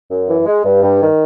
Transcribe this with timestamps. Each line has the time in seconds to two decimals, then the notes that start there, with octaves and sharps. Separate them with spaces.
0.11 F#2
0.28 E3
0.46 G#3
0.64 G2
0.82 G2
1.00 D#3